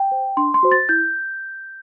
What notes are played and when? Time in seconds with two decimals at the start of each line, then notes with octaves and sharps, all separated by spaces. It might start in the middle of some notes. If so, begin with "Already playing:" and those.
Already playing: G5
0.12 C5
0.37 D4 C6
0.54 C6
0.63 F#4 C5
0.72 A6
0.89 E4 G6